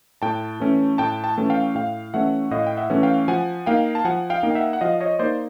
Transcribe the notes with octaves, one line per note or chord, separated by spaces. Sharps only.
A2 G5 A5
E3 A3 C#4
A2 G5 A5
G5 A5
E3 A3 C#4
F5 G5
A2 F5 G5
E3 A3 C#4 E5 F#5
A2 D#5 F5
G5
E5 F#5
E3 A3 C#4
F5 G5
F3 F#5 G#5
A#3 D#4 F5 G5
A5
F3 F#5 G#5
F5 G5
A#3 D#4
G5
E5 F#5
F#5
F3 D#5 F5
C#5 D#5
A#3 D#4 C5 D5